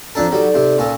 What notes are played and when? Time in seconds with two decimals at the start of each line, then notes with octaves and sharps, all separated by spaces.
0.15 F2 D4 A4 A#5
0.31 F#3 G3 D#4 A4 D5
0.54 C3
0.78 A#2 C#4 A4